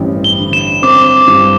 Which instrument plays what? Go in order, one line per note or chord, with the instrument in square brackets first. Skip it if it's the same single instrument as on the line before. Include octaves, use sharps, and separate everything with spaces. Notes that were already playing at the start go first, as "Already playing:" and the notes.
Already playing: [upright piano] A1 G2 C4
[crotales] G7
[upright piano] D3
[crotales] E7
[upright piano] C4 [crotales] D6
[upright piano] G2